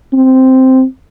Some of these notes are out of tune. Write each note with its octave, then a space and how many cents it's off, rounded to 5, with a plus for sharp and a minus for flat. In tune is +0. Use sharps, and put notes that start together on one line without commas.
C4 -5